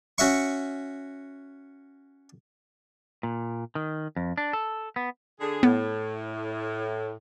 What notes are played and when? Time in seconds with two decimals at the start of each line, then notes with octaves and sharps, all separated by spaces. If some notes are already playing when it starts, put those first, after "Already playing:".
0.18 C#4 F#4 E5 C#6
3.23 A#2
3.75 D#3
4.16 F2
4.37 D4
4.53 A4
4.96 B3
5.40 D3 G#4
5.63 A2 B3